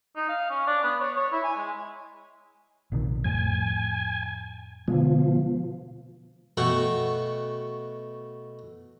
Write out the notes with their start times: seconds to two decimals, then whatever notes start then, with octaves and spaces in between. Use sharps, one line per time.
0.16 D#4
0.29 F5
0.50 C#4
0.67 D4
0.84 B3
1.00 C#5
1.16 C#5
1.32 E4
1.44 G#5
1.57 G#3
2.92 A#1 C3 D#3
3.24 F2 A2 G#5
4.88 B2 D3 F3 G#3
6.57 B2 A3 F#4 F#5 G5 C#6